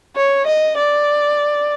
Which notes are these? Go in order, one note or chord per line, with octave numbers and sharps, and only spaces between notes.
C#5
D#5
D5